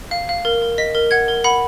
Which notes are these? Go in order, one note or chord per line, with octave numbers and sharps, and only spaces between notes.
F5
F5
A#4
A#4
D#5 B6
A#4
F#5 G#6
A#4
F#5 B5